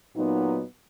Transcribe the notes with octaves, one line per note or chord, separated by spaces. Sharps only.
A#2 F#3 B3 D#4